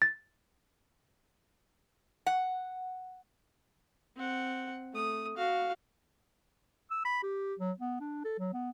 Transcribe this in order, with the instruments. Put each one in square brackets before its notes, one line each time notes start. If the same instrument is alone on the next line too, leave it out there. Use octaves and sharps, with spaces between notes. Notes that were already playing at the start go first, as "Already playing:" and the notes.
[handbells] A6
[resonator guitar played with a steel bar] F#5
[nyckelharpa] C4 F#5
A3 D#6
F#4 F5
[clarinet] E6
B5
G4
F#3
B3
D4
A4
F#3
B3